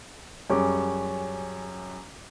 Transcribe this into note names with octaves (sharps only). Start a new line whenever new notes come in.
F#2 G3 C#4 G#4 D6